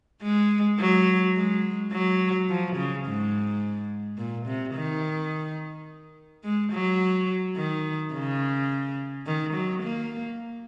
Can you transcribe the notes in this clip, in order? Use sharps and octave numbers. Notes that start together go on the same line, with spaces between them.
G#3
F#3
G#3
F#3
F3
C#3
G#2
A#2
C3
D#3
G#3
F#3
D#3
C#3
D#3
F#3
A#3